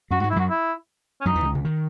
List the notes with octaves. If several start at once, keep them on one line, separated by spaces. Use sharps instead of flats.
F#2 F#3 F#4
F#4
G#2 G#3
E4
F#2 F#3 F#4
E4
C#4
F#2 F#3 D#4
E2 E3
C#2 C#3
C#2 C#3
D#3